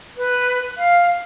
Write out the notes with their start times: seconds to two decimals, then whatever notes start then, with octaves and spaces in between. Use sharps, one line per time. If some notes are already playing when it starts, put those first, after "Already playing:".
0.16 B4
0.76 F5